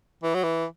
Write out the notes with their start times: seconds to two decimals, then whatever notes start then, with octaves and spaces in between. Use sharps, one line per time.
0.23 E3
0.34 F#3
0.43 E3